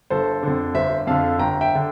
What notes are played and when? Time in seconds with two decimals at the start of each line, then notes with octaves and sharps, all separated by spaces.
0.10 G1 A4 C5
0.43 F2 D3
0.74 G1 C5 E5
1.07 F2 D3 F5 A5
1.39 G1 G5 A#5
1.61 E5 G5
1.75 D3